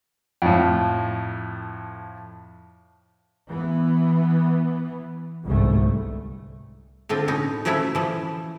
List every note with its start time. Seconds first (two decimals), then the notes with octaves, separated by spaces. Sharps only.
0.42 F2 A2
3.49 E3 B3
5.44 G1 C2 G#2 A3
7.09 A2 D3 C4 F4
7.28 B2 C#4 D#4
7.65 F3 F#3 A3 C#4 E4 C#5
7.95 E3 F3